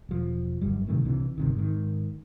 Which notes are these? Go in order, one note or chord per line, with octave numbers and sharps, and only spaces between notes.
E1 F3
G1 F#2 G3
A2 C3 D#3 A3
C2 C3 E3 D4
G1 C3 D#3
G#2 D#3